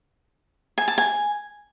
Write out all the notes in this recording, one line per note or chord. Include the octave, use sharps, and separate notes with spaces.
G#5
A5
G#5